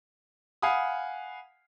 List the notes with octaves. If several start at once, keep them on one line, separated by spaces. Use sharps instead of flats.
F5 F#5 G#5 B5 D#6